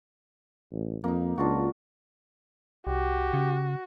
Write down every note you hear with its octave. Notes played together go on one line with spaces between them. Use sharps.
A1
F2 A#3 D#4
C#2 D4 F4 F#4
C2 F#4 G4
C#3